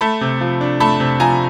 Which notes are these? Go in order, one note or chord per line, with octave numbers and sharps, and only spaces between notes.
A3 A5 B5
C3
F3
D4
A3 A5 B5
C3
F3 G#5 A#5